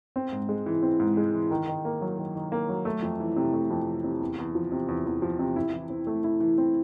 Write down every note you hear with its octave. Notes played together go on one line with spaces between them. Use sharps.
C4
G#2
G#3
E3
C4
G#2
G#3
E3
D#3
D#3
A#3
F#3
D#3
D#3
A#3
F#3
A3
F2
E3
C3
A3
F2
E3
C3
E2
E2
F3
C3
E2
E2
F3
C3
E4
E3
C4
A3
E4
E3
C4